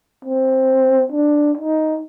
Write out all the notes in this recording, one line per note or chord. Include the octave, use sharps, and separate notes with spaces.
C4
D4
D#4